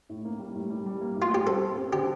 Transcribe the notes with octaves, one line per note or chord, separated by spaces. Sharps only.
A2
A#3
G3
A2
G3
G3
A#3
A2
F4
G3 G4
C4 A4
C4
C4
D3 G4